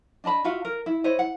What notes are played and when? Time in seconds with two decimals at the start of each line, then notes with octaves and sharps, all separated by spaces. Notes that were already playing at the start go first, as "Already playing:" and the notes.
0.24 D4 D#5 A5 B5
0.44 F4 F#4 E5 F5
0.65 A#4
0.86 E4
1.04 E4 C5 C#5 D#5
1.19 F#5